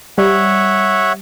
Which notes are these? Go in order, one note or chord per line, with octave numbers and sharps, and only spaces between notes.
G3 C#5 E5 F#5